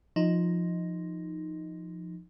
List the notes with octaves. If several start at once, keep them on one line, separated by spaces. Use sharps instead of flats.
F3 D#4